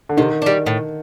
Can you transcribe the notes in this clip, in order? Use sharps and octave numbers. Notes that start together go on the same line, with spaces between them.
D3
C3 D#3
G3 D4
A2